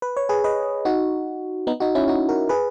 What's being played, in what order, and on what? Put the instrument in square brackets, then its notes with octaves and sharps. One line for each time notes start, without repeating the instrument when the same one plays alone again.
[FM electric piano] B4
C#5
G#4 B4
B4 D#5
D#4 F#4
B3 D#4
D#4 F#4
C#4 E4
D#4 F#4
F#4 A#4
G#4 B4